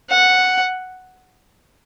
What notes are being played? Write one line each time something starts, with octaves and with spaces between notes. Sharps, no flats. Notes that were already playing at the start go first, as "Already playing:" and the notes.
F#5